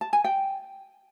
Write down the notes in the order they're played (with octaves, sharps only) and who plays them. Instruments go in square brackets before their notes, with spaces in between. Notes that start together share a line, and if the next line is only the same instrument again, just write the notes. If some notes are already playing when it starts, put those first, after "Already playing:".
[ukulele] A5
G#5
G5